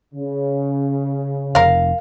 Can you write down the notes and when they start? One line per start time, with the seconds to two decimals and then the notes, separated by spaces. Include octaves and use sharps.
0.14 C#3
1.55 F1 F2 A#4 F5